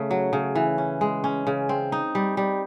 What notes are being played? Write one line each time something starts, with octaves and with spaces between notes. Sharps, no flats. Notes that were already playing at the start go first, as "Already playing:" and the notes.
Already playing: C#3 A3
F#3
C#3
E3
C#4
G#3
C#4
C#3
C4
D#4
G3
G3